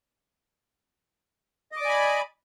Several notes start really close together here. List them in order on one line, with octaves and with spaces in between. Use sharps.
D#5 D6 D5 G#5 B5